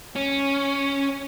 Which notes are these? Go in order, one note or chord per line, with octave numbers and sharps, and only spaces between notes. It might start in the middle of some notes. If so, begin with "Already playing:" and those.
C#4